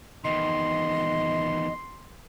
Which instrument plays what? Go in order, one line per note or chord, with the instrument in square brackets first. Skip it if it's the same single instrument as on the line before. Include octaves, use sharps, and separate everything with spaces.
[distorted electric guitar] E2 D#3 [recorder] D#5 [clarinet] C6